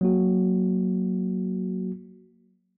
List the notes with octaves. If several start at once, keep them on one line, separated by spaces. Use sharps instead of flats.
F#3 A#3 F#4